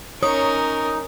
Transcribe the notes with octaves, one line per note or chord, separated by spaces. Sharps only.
C#4 D#4 A#4 C#5 D#6